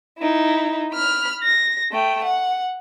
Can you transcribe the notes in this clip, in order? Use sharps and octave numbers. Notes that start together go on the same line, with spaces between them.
D#4 E4
B5 F6
A#6
A3 G5
F#5